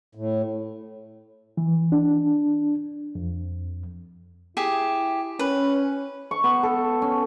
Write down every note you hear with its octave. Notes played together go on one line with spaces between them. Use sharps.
A2
E3
D4
F2
E4 G4 G#4 E5
C#4 B4
C#6
B3
A4
C#4